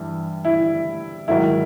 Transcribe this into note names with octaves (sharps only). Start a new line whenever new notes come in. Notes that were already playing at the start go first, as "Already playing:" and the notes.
Already playing: G2 E3 G3
E4
G#2 D#3 F#3 E4